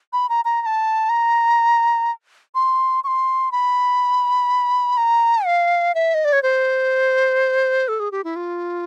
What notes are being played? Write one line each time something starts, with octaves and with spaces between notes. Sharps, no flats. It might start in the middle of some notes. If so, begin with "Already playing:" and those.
B5
A#5
A#5
A#5
A5
A#5
C6
C#6
C6
B5
A#5
F5
E5
D#5
D5
C#5
C5
A4
G#4
G4
E4
F4